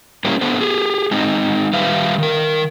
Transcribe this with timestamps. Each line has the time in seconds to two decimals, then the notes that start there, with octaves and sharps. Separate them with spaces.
0.25 G3 A#3 C#4 E4 G4
0.41 B3 D4 A4 C5
0.61 G4 G#4
1.11 G#3 C4 D#4
1.73 D#3 G3 B4 E5 F5
2.18 D#3 A#4